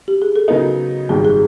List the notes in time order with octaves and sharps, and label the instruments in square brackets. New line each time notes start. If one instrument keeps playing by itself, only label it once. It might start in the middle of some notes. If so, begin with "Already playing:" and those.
[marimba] G4
G#4
A4
[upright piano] C#3 F#3 B3 D#4 [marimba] A#4
[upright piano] G#1 F#2 D#3 G3 [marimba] G#4
[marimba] G#4